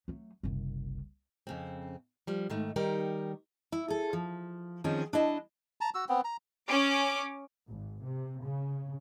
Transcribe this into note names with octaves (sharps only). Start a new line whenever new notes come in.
F#3 A3
F#1 C2
F2 C#3 C4
F3 G3
G#2 D#3 A3
D#3 G3 D#4 G4 A#4
E4
G#4 A4
F3
D#3 F3 C4 C#4 G#4
D4 E4 D#5 A5
A5 A#5
F#4 E6
B3 C4
A#5
C#4 D6
G#1
C3
C#3